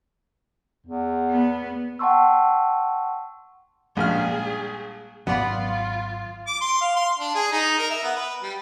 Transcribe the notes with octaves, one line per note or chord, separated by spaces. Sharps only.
E2
B3
F#5 G5 A5 C6 C#6 E6
A#1 G2 G#3 A#3 G#4 F6
G#1 F#3 B3 F4 D5 B5
D6
C6
F5
C6
D4
G#4
D#4
A#4
E5
B3
B4
G3